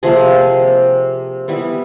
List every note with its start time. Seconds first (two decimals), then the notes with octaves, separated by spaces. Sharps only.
0.03 C3 F3 A#3 G#4
1.48 E3 G3 B3